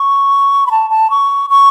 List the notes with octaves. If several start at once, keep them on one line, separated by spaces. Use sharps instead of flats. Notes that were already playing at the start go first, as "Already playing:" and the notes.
Already playing: C#6
B5
A5
A5
C#6
C#6